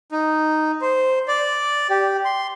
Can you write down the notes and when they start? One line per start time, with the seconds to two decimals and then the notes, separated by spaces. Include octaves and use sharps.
0.12 D#4
0.81 C5
1.28 D5
1.90 G4
2.25 C6